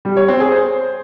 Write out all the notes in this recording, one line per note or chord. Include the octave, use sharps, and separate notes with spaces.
G3
C#5
C4
G#4
C5